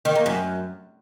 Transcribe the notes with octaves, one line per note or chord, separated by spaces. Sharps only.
D#3
A#3
F#2